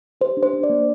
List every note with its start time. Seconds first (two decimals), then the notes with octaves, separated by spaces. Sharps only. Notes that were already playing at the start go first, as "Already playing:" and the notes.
0.21 G4 C5
0.37 D4
0.43 C5
0.53 D4
0.63 D5
0.70 A#3